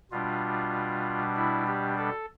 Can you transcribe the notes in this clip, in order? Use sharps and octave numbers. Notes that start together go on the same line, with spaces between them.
B2 G3 D4 F4
E4
G4
A4